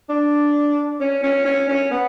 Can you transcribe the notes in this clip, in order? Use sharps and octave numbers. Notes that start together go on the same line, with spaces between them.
D4
C#4
C#4
C#4
C#4
B3